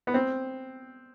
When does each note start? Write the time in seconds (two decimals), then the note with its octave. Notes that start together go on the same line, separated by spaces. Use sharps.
0.07 B3
0.14 C4